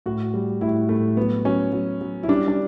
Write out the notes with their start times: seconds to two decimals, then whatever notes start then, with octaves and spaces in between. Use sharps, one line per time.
0.06 A2 F#4
0.34 G3
0.61 A2 E4
0.89 A2 A3
1.17 F#3 B3
1.45 F#3 C#4
1.73 F#3
2.01 F#3
2.23 E4
2.28 G3 D4
2.48 D4